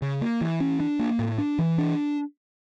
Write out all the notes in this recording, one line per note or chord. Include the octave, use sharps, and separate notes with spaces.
C#3
A#3
E3
C#4
D4
A#3
A2
D4
E3
D4